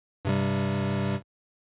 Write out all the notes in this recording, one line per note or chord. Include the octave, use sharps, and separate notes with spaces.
G2 C3 G3